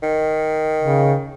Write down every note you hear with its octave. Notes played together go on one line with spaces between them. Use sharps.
D#3
C#3